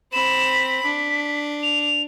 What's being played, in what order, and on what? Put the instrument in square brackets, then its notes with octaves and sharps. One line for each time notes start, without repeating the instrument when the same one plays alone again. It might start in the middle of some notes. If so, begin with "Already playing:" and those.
[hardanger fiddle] C4 B5 [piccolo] E7
[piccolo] B6
[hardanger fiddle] D4
[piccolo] F7